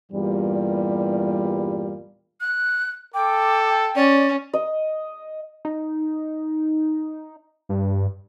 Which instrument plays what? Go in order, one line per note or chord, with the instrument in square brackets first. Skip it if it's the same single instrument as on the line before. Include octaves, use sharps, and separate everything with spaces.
[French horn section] E2 G2 A#2 G3
[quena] F#6
[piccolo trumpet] A4 [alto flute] G5 [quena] D6
[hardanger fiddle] C#4 [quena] D5
[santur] D#5
[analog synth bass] D#4
[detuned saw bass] G2